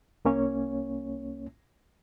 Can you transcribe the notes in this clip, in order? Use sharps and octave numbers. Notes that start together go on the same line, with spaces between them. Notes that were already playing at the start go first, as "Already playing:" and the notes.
C2 A#3 C#4 C#5